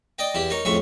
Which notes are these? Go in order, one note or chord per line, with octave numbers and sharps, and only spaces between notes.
D5 D#5 G5
E2 E4 G4
D#4 A#4 C#5
F2 A2 G#3 C#4 E5 C#6